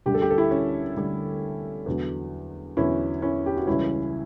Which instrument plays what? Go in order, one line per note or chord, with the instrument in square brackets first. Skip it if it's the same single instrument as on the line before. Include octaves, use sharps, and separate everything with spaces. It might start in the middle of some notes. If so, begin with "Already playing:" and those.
[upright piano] D2 D3 G3 G4
A4
G4
A4
E4 G4
C#4
D2 D3 G3
E2 D3 F#3
E2 D3 F#3 C#4 E4
C#4 E4
G4
F#4
C#2 C#3 E3 G3 C#4 E4